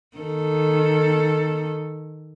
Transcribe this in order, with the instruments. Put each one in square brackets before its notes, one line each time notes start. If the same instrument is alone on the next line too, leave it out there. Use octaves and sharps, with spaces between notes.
[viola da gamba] D#3 A4